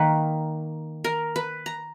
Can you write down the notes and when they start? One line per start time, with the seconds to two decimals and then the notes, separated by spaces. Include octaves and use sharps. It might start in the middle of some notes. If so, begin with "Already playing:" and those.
Already playing: D#3 A#3 B4
1.04 A#4
1.36 B4
1.66 A#5